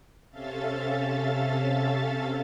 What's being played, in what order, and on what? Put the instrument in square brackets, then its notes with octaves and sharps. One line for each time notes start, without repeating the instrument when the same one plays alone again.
[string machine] C3 C#4 A4 E5 F5 A6